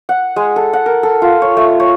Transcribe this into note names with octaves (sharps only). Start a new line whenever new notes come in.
F#5
G#3
A4
F#5
A#4
A4
F4
C#5
A3
C#5